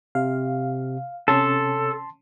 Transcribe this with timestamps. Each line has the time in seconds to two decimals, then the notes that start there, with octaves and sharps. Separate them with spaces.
0.15 C3 F5
1.28 C3 C#4 A4 A5 C6